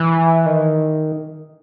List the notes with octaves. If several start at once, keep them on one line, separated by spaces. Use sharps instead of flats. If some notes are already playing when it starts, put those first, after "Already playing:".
Already playing: E3
D#3